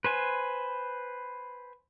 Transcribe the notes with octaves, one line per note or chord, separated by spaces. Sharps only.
B4 C5 G#5